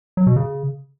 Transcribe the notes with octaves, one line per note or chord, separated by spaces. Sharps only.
F#3
B2
C#3